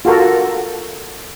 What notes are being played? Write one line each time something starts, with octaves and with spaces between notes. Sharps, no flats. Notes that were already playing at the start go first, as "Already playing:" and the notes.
F4 F#4 A4 A#4